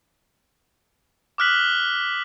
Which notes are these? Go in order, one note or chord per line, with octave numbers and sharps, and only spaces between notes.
D6 D#6 F6 F#6 B6 F#7